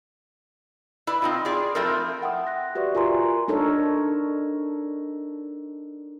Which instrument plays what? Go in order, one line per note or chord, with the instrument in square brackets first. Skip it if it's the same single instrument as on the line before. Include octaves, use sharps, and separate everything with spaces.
[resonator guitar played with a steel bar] E4 B4 D5
C4 D#4 F4
F4 G#4 D5
F3 A3 C4 E4 F4 A#4
[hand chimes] E5 F#5 G5 C6 D#6
F#6 A#6
F#4 G4 B4 D5 E5 C#6
F4 A#4 G#5 A#5 C6
[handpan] D4 D#4 A4 A#4 C#5